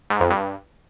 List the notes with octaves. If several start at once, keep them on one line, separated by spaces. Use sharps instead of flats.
G#2
F2
G2